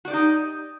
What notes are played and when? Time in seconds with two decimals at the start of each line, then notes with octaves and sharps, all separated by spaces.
0.05 F#4
0.08 D5
0.11 G4
0.13 D#4